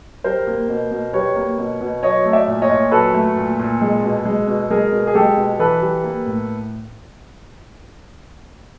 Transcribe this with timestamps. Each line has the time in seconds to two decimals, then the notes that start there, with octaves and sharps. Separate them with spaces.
0.24 G3 A#4 C5
0.47 A#3
0.69 B2
0.91 B2
1.13 G3 B4 C#5
1.36 A#3
1.58 B2
1.81 B2
2.03 F#3 C#5 D#5
2.25 A3
2.33 D5 E5
2.47 A#2
2.62 C#5 D#5
2.69 A#2
2.91 F#3 A4 B4
3.14 A3
3.36 A#2
3.59 A#2
3.81 G#3
4.03 B2
4.25 G#3
4.47 B2
4.70 G#3 G#4 A#4
4.92 B2
5.07 G#4
5.15 G#3 G4 A4
5.37 B2
5.59 E3 A4 B4
5.82 G3
6.04 A#3
6.26 A2